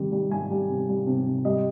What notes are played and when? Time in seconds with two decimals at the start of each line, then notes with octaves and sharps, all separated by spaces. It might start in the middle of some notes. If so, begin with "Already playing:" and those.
Already playing: C3 D#3 G3
0.12 G3
0.31 G3 G#5
0.50 G3
0.69 C3
0.89 G3
1.07 C3
1.26 C3
1.45 G3 D#5